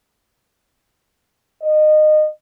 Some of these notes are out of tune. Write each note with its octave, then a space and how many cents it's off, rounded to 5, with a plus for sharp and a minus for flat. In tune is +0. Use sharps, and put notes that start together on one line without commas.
D#5 -25